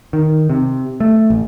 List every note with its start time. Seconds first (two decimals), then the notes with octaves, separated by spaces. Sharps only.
0.13 D#3
0.50 C3
1.00 A3
1.30 A1